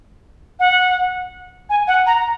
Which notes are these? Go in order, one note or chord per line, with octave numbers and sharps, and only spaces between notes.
F#5
G#5
F#5
A#5